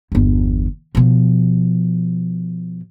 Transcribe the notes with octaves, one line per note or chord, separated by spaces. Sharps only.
G1 E2
B2 F3